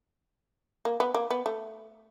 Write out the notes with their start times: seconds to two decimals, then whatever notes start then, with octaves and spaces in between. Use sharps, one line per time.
0.85 A#3
1.00 B3
1.14 A#3
1.30 B3
1.46 A3